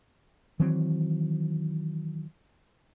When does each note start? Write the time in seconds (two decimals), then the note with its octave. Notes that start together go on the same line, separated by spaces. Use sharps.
0.60 D#3 E3 F#3 C4